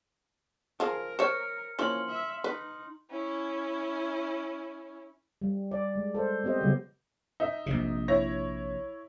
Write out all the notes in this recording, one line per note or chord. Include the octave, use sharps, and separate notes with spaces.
F3 G#4 A#4
C5 C#5 F6 C#7
E3 F3 A#3 C#4 C6 F6 F#7
E5
D#4 B4
C#4 E4
G3
D5
G#3
A4 C5
B3 C4 G4 C5 D#5
C#3 F#3 G3 B3
D#4 E5
A#1 C3
E4 C#5 A#6